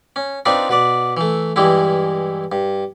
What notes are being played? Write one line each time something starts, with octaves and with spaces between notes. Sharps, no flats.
C#4
C4 D4 D#4 F4 B4 D5
B2 B4 D5
E3 A3
G2 E3 G3 G#3 E4
G2